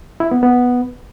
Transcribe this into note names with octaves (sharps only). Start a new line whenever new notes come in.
E4
B3
B3